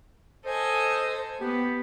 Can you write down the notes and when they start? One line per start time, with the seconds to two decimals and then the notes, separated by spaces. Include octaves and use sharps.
0.45 A4 C5 D#5 G#5
1.41 B3 G4